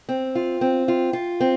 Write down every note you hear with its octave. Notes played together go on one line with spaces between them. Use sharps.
C4
F4
C4
F4
F4
C4